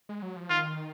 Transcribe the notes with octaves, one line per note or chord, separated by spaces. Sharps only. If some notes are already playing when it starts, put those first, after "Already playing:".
G#3
F#3
F3
D#3 F4